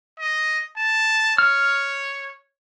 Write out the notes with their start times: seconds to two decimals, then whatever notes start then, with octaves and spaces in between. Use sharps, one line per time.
0.19 D#5
0.76 A5
1.38 C#5 F6